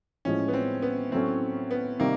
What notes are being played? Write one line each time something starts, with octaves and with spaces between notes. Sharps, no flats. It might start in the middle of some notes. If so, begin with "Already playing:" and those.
A1 A2 F3 G#3 C#4
B3
C4
B3
A2 F#3 A3 C4 C#4
B3
C3 D#3 G3 A#3